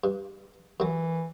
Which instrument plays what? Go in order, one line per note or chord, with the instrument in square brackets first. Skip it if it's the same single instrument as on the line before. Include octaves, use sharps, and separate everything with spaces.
[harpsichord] G2
[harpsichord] F#2 F#3 [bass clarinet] E3